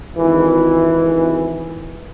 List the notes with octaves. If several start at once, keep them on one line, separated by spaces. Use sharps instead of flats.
G#1 E3